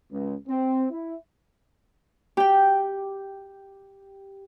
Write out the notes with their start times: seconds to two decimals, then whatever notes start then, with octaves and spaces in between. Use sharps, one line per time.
0.11 C#2
0.48 C4
0.91 E4
2.37 G4 G5